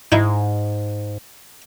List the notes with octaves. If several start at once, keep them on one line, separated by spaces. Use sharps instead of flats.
G#2 D#4 E4